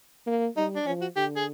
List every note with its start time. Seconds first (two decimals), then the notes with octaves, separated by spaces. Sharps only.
0.27 A#3
0.57 G3 D#4
0.76 D4
0.86 F3 C#4
1.01 F#4
1.16 D3 G4
1.36 G#4